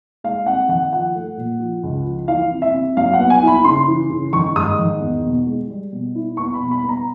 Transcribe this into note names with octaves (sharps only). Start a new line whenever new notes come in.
G#3 F5
C3 F#5
D#3 F#5
F3 F#5
A3
A#2
F3
C#2
F3
E3 F5
C3
E5
C3
F#3 F5
F#5
B3
G#5
E4 B5
C#3 C6
E3
C#3
D#3 C#6
G#2 D#6
D#3
E2
B2
G#3
G3
B2
E4
B3 C#6
B5
B2
B5
B3
A#5